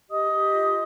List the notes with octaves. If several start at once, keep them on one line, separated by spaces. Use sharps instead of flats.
G4 D#5 D#6
G4
F4